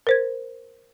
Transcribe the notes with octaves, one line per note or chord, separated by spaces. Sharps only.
A#4 C5 G#6